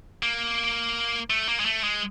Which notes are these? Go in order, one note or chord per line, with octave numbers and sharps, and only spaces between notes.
A#3
A3
A#3
G#3
A3
G#3